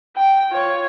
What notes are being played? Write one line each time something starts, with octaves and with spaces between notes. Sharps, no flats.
G5
F4 C#5